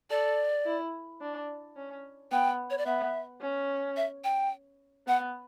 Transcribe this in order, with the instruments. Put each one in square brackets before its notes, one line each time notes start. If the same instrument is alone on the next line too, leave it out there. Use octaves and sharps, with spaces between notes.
[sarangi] A4 [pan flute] D5
[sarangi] E4
D4
C#4
[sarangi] B3 [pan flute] G5
[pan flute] C#5
D5
[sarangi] B3 [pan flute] E5
[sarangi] C#4
[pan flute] E5
G5
[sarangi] B3 [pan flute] F#5